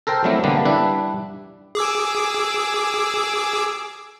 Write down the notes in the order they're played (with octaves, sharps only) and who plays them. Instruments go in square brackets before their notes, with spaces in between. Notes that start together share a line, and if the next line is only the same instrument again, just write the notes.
[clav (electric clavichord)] A4 A#4 C5 G5
F#3 G3 A3 C4 E4
D3 G3 A#3 B3 D4
G3 D4 E4 B4
[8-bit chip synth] G#4 D6 E6